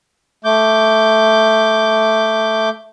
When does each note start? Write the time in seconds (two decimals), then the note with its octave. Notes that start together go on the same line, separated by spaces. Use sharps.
0.45 A3 D6 G6